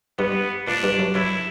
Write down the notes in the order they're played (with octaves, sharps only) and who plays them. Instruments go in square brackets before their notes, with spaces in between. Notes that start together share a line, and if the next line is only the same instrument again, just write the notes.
[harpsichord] G2 [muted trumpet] B3
[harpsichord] A#2 [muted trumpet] D4
[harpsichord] G2
F#2
[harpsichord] F#2 [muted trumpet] E4